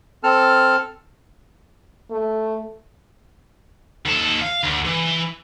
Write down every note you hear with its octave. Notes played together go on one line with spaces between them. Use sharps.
C4 A4 A5 F6
A3
D#2 A4
F5
D2
E3